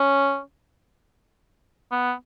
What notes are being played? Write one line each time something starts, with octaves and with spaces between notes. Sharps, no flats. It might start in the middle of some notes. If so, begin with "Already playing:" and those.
Already playing: C#4
B3